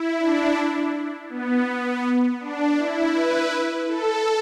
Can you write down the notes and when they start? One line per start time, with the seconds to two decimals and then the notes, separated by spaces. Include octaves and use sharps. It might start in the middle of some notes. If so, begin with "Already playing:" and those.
Already playing: E4
0.19 D4
1.29 B3
2.40 D4
2.78 E4
3.14 B4
3.87 A4